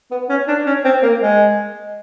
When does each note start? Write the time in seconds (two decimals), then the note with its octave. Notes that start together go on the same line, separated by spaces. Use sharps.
0.11 B3
0.29 C#4
0.48 D4
0.66 C#4
0.85 C4
1.03 A#3
1.21 G#3